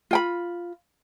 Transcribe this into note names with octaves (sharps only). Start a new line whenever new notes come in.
F4 G5 B5